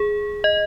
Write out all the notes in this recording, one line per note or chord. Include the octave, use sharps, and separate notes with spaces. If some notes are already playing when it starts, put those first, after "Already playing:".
Already playing: G#4
D#5